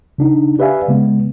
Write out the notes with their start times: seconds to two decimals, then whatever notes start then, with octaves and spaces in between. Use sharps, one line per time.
0.18 C#3 D4 D#4
0.59 G4 B4 D5 E5 F5 G#5
0.88 C#3 G#3 B3